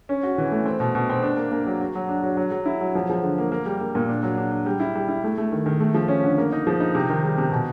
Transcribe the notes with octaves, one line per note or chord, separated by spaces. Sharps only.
C#4
F#4
E3
A3
C4
B2
B2
C4
D4
A#3
A#3
F#3
F#4
F#3
D4
F#3
F#3
F#3
E4
F#3
F3
F3
D3
A#3
A#3
G3
A#3
A#2
D4
F#3
D4
D4
G3
E4
G3
E4
A3
A3
D#3
D#3
A3
F3
C#4
D3
A#3
D#4
F3
D#4
C3
D#3
G3
C3
B2